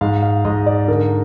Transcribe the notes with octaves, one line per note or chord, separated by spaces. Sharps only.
G#2 F5
F5
G#2 D#5
D5
D3 A#4